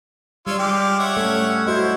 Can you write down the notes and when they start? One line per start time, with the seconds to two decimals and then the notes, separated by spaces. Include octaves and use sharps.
0.47 G3 F4 C#5 D5 E6
0.59 G#3 G4 F5 D6
0.99 C#5 E5 F#5
1.17 A2 A3 C#4 A4
1.67 E4 F#4 C5 D#5